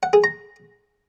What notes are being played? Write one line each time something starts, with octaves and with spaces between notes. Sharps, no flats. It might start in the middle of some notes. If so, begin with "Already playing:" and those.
F#5
G#4
A#5